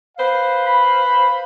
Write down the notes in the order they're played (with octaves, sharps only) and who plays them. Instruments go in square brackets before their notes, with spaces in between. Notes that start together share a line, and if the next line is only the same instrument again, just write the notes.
[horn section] B4 C5 F5
[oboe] B5